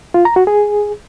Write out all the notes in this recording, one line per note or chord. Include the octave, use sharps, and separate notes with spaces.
F4
A#5
F#4
G#4